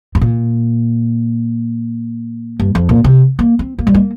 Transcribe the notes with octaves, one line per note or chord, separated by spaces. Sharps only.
G2
A#2
G2
F2
A#2
C3
A#3
C4
A#3
G3
A#3